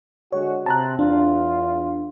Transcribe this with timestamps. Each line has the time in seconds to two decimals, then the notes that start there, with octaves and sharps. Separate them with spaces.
0.32 D3 G#3 F#4 C#5
0.66 C3 C4 A5 A#5 F#6
0.99 E2 D4 F4